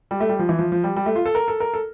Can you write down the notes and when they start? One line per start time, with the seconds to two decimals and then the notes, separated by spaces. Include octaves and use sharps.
0.11 G3
0.20 A3
0.29 G3
0.39 F3
0.49 E3
0.59 F3
0.72 F3
0.84 G3
0.96 G3
1.06 A3
1.16 F4
1.26 A4
1.35 A#4
1.48 A4
1.60 A#4
1.74 A4